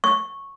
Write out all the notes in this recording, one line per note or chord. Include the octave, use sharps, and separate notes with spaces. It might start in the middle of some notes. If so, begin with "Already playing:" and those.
C#6